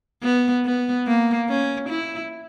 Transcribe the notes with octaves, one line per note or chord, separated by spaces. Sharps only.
B3
B3
A#3
C#4
E4